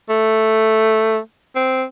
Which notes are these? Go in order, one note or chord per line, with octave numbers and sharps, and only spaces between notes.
A3
C4